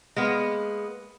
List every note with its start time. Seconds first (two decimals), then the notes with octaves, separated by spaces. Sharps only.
0.16 G#3 A#3 B3